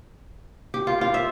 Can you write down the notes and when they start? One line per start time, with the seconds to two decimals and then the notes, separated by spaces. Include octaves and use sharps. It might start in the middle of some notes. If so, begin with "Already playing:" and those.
0.74 G4
0.87 F4
1.01 F4
1.14 E5